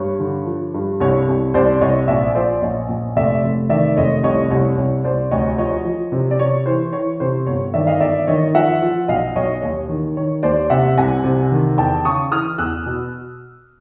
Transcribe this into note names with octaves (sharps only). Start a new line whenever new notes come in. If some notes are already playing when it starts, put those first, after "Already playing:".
Already playing: G2 C#5
D3
F3
G2
C2 C#5
C2
C2 C5 D5
C2 C#5 D#5
A#1 D5 E5
F3 C5 D5
A#1 C#5 D#5
A#1
F1 D5 E5
F1
D#3 D5 E5
F1 C#5 D#5
C2 C#5 D#5
C2 C#5
C2 C#5
C2 C5 D5
D2 C#5 D#5
F3 C#5 D#5
F3
C3
D5
C3 C#5
E3 C5
E3 C#5
C3 C5
G1 C#5
D#3 D5 E5
D#5 F5
G1 D5 E5
D#3 C#5 D#5
F3 E5 F#5
F3
B1 D#5 F5
B1 C#5 D#5
D#2 C#5
D#3
D#3 C#5
D#2 C5 D5
C3 E5 F#5
C2 F#5 G#5
C3
D#3
E2 G5 A5
C#3 C#6 D#6
E3 D#6 F6
E2 E6 F#6
B2